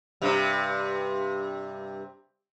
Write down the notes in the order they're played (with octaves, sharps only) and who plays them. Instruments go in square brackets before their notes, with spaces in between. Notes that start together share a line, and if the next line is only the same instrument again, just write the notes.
[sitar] G2 C3